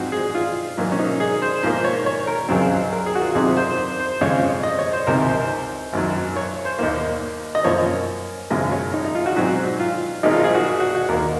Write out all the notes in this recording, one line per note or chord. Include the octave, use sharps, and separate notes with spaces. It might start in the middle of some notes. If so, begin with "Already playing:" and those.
Already playing: G#2 F3 C4 F#4
G#4
F4
G#2 F#3 A#3
C#4
D#4
G#4
C5
G#2 F3 A#3 C5
C#5
C#5
A#4
C#2 C#3 F#3 C4
A#4
G#4
F#4
F4
F2 C3 D#3 F#3 G#4
C5
C5
C5
F2 C#3 G#3 C#5
D#5
C#5
C5
C#2 C3 D#3 A#4
C5
G#1 F#2 D#3 F#3
C#5
C5
D#2 D#3 A#3
D#5
F#2 F3 A#3 C#5
G#1 F#2 C#3 G#3 D#5
C#5
D#4
D#4
F4
F#4
G#2 F#3 C4 F#4
F4
G#1 G#2 D#3 G#3 D#4
F4
G#4
F#4
G#4
F#4
F#4
D#2 D#3 A#3 A#4